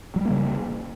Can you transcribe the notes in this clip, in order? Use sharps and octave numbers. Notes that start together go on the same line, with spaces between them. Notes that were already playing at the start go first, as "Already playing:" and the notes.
C#3 F#3 G3 A#3